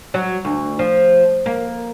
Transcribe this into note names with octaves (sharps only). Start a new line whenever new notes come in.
F#3
D2
F3
A#3